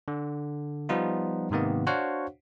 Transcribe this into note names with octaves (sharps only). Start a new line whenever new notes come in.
D3
F3 G3 B3 D#4 F4
G#2 C3 D#3 A#3 B3
D4 F#4 C5 C#5 F5 F#5